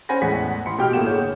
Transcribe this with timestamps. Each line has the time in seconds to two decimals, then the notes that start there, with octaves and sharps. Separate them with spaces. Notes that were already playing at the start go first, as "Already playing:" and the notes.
0.09 C#4 C5 F#5 G#5 B5 A#6
0.22 E2 A2 G#3 F#5 B6
0.66 A1 B5 C6 C#7
0.78 B2 G4 G5 D6 F6
0.93 A2 A3 A#3 F#5 E7
1.06 G1 G#4 C#5 G6 E7